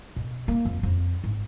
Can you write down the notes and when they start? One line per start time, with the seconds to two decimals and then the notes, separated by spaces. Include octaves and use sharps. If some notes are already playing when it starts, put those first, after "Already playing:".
0.16 B2
0.48 A#3
0.65 F2
0.83 F2
1.24 G#1